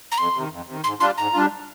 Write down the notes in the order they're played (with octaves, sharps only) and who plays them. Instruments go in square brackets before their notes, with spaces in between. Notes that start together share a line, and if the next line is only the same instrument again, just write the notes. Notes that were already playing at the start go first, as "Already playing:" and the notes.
[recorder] A#5
[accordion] F2 [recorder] C6
[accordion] C3 D#3
F2
C3 D#3
[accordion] G#2 [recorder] C6
[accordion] G3 D4 F4 [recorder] C6
[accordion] G#2 [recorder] A#5
[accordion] G3 D4 F4